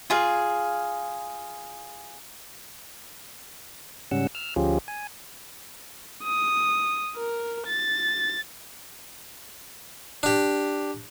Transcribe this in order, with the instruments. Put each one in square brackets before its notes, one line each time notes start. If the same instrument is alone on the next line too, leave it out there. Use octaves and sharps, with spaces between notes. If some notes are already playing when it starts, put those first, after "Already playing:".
[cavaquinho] F4 G#4 F5
[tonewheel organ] G#2 C#3 G3 C#4 F#5 E6
E6 F6
D2 F3 C#4 F4 G4 G#4
G#5
[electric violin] D#6
A#4
A6
[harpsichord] D4 G4